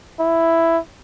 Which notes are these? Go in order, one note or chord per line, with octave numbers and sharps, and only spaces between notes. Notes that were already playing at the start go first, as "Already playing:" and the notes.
E4